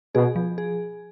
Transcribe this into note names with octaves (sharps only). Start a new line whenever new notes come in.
B2 G#4
F3
G#4